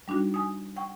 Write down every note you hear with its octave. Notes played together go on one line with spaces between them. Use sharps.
G3 D4 D#4 F#4
G#5 D#6
F#5 G5 C#6